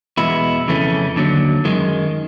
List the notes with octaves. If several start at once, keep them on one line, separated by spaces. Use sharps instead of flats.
E2 B2 G#3 B3 E4
F2 C#3 E3 A3 C#4
D#2 D3 F#3
F#2 D#3 G#3